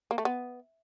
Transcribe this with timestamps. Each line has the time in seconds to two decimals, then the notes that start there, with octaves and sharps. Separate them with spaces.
0.11 A#3
0.18 A3
0.25 B3